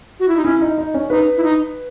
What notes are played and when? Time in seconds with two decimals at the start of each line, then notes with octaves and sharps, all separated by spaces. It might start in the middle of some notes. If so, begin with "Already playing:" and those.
0.20 F#4
0.28 E4
0.37 D#4
0.45 C#4 E4
0.61 D#4
0.78 D#4
0.94 C#4
1.10 D#4 B4
1.37 E4
1.43 D#4